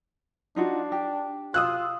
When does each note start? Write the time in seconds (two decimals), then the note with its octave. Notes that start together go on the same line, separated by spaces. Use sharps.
0.56 D4 D#4 F4 F#4
0.92 G4
1.54 F4 D#6 E6 F#6